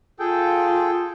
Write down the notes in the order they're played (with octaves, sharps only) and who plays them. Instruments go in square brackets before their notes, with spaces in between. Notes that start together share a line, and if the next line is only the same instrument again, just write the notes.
[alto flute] F4 [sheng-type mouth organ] G#4 A4 G5